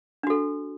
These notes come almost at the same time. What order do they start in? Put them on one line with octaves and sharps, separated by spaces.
D4 F#4 A4